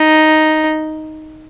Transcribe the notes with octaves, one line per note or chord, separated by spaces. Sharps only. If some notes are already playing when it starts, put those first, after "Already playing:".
Already playing: D#4